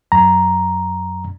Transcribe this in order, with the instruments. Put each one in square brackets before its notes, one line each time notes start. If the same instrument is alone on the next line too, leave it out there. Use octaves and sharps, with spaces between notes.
[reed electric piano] F#2 A#5